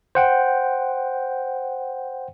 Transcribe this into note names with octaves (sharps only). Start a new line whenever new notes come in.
C5 F#5 G5